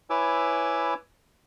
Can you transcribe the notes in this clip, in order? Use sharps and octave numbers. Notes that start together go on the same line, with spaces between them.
E4 B4 C#5 G#5 D6 E6